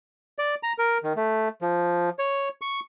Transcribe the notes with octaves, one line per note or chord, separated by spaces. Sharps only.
D5
A#5
A#4
D#3
A3
F3
C#5
C#6